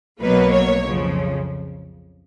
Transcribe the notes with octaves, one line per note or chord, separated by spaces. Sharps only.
B1 B2 F#3 A#3 B4
C#5
F2 C#3 F3